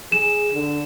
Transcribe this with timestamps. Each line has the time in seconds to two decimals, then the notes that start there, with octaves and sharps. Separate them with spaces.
0.12 G#4 E7
0.54 D3